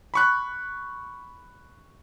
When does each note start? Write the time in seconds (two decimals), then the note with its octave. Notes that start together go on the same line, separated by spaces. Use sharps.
0.14 B5 C#6 F#6